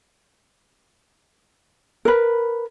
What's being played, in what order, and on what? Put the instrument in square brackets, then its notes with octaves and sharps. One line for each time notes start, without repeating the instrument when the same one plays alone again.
[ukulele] A#4 B4